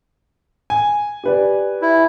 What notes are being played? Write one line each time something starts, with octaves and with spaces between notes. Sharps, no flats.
G#5
G4 B4 D5
E4